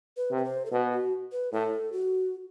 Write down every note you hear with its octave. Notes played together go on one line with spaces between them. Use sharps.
B4
C3
B4
C5
A4
B2 B4
F#4
B4
A2 A4
F#4